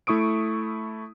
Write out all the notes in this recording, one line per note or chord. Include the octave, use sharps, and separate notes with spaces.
A3 E4 C#6 D#6 D7